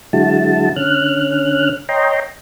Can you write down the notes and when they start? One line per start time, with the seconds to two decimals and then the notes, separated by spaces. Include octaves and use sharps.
0.13 D3 F#3 G#3 E4 F#4 A5
0.76 D3 C#4 F6 F#6
1.89 C#5 D#5 G5 A#5 C6